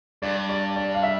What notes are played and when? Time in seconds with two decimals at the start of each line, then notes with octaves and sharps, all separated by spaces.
0.22 G2 D5
0.49 D5
0.76 D5
0.95 F5
1.03 E5